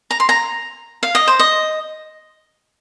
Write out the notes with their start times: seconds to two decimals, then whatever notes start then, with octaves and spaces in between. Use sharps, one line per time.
0.11 A#5
0.20 C6
0.29 A#5
1.03 F5
1.15 D#5
1.28 C5
1.40 D#5